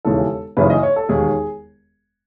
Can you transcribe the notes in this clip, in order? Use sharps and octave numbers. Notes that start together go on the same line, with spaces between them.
E1 D#2 C#3 E3 A4
F#1 F#2 C#3 E3 B4
D#5
C#5
A4
E1 D#2 D#3 G#4